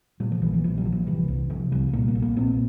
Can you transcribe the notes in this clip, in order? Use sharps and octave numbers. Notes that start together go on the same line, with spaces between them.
A#2 G3
F3
A#1 E3
E3
A#2 F3
G3
A#1
F3
C3 E3
C2
C3 F3
C2 G3
A#2 A#3
A#3
A#1
A#3
A#2 C4